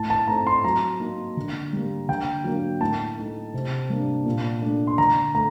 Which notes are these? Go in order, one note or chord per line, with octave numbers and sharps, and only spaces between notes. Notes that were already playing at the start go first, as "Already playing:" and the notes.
Already playing: A2 A5
A5
A3 C4 D#4 A#5
C6
F#3 A#5
A#3 D#4
D3
G3 A#3
D3 G5
F#3 A#3 D4
A2 A5
A3 D#4
C3
G3 A#3 D4
A#2
A3 D4
C6
D3 A#5
A3 A#5